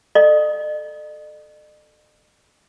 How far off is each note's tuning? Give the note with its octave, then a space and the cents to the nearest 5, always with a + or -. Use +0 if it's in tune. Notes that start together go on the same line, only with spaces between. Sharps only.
A4 +0 D#5 -45